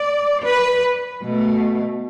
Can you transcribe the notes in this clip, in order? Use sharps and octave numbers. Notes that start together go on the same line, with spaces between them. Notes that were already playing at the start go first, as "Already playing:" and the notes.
Already playing: D5
B4
B2 A3